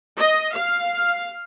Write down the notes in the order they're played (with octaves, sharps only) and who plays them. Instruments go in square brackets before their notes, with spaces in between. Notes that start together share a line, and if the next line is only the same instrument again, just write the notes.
[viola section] D#5
F5